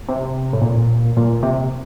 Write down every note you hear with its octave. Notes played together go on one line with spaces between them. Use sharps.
C3
A2
A#2
A#2
C3